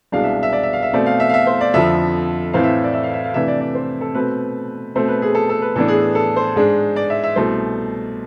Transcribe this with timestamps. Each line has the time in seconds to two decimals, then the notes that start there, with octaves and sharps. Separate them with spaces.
0.12 C2 B2 G#3 D4 F5
0.24 E5
0.43 E5
0.53 D5
0.63 E5
0.73 F5
0.83 E5
0.93 B2 A3 C4 D5
1.06 F5
1.20 E5
1.29 F5
1.34 E5
1.47 C5
1.61 D5
1.74 F2 D3 F3 E5
2.53 A2 E3 A3 C4 F5
2.64 E5
2.84 D5
2.94 E5
3.04 F5
3.14 E5
3.24 F5
3.34 C3 E3 A3 D4 E5
3.48 D5
3.61 D5
3.75 C5
4.01 A4
4.15 B2 A3 C4 B4
4.95 B2 A3 C4 C5
5.08 B4
5.22 G#4
5.35 A4
5.49 A4
5.62 B4
5.76 A2 E3 B3 D4 A4
5.88 G#4
6.15 A4
6.36 C5
6.56 G#2 G#3 D4
6.96 D5
7.10 E5
7.23 E5
7.36 C2 B2 A3 C5